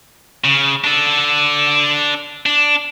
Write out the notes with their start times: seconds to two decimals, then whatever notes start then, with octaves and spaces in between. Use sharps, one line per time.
0.44 C#3
0.84 D4 A4
2.46 D4